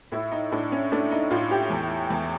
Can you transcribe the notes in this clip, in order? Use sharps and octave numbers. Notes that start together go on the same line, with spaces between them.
A2 E4
D#4
A2 D4
C#4
A3 D4
D#4
A2 F4
G4
E2
E2